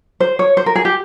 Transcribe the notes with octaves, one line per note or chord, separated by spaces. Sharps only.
C5
C#5
C5
A#4
G#4
G4